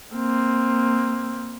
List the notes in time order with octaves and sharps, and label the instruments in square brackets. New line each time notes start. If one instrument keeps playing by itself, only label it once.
[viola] A#3 C4